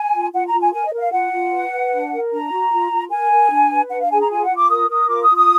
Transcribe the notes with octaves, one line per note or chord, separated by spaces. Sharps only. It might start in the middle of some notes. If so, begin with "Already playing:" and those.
Already playing: G#5
F4
F4 F#5
A#5
F4
G#5
A#4 G#5
D#5
A#4
F5
F4 F#5
F4
B4
B4
D4
A#4
D4 A#5
F#4
F4
F4
A#4 G#5
A#4
D4
B4
D4 F#5
F5
G#4 G#5
A#5
F4 G#5
F#5
F4
D6
A#4 D#6
A#4 D#6
F4 D6
D#6
F4
D#6